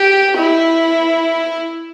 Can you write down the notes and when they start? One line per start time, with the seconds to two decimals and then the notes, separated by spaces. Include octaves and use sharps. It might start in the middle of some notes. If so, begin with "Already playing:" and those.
Already playing: G4
0.37 E4